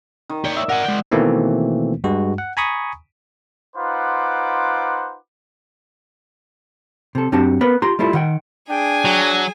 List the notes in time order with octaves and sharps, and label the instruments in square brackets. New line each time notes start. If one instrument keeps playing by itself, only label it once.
[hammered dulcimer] D#3
[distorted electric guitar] G4 C#5 [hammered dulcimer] D5
[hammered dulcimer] E5
[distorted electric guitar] A#4 G#5 [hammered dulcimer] F#5
[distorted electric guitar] G#3 G5
[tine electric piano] B2 D#3 E3 A3 A#3 C4
G2 G#3 F#4
F#5
G#5 A#5 B5 C#6 D#6
[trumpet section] D#4 F4 B4 C5 F#5 D6
[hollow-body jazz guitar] C3 A4
F#2 C4 D4 G4 F#5 A5
B3 A#4 B4
F4 G4 A#5 C6
G3 A3 E4 F4 A4
D#3 F#5 G5
[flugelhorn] D4 [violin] G#4 G#5 [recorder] G5
[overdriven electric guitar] F#3